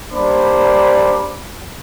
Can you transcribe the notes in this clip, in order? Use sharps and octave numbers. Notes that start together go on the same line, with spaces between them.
G3 A#3 D4 C5 B5 D6